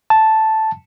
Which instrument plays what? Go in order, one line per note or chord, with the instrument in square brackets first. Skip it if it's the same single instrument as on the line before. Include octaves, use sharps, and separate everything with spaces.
[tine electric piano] A5